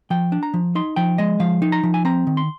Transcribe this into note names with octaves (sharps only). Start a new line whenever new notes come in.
F3 G5
D4
A#5
F3
D#4 C6
F3 G5
G#3 D#5
F3 F5
D#4
A#5
F3
G#5
C4 A#5
D#3
C6